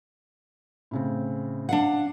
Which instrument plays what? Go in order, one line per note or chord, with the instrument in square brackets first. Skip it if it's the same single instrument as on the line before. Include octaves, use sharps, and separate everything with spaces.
[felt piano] A2 C#3 C4
[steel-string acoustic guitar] D4 F5 F#5